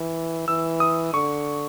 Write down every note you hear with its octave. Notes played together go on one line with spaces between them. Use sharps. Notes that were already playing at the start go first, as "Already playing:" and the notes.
Already playing: E3
E3 E6
D#6
D3 C#6